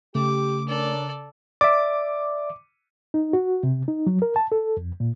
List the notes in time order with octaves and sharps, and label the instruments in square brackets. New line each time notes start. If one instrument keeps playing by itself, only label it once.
[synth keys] C#3 [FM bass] A3 [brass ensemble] G4 [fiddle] D6
[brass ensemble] C#4 D4 A#4 [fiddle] A4 D5
[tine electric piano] D5 E5 [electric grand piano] D6
[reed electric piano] D#4
F#4
C3
D#4
F#3
A#4
A5
A4
F2
A#2